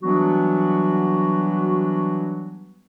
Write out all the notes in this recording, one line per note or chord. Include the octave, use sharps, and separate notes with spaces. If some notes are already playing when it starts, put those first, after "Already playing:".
E3 F#3 G3 B3 D4 F#4